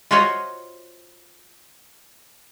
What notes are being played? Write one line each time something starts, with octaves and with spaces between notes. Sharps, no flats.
F4 F#4 C5 C#5 D#5 E5